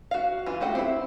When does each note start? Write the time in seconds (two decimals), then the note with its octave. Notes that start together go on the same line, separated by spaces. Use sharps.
0.11 F#4 F5
0.46 E3 F4
0.60 A3 F#4 G4 F#5
0.75 C4 E4